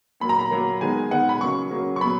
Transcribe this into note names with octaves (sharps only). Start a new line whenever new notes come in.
A#2 F#3 A#3 B5
A#5
B5
A#2 F#3 A#3
D#3 G#3 B3 G#5
D#3 G#3 B3 F#5
B5
C#3 F#3 A#3 C#6
C#3 F#3 A#3
C#6
A#2 F#3 B3 B5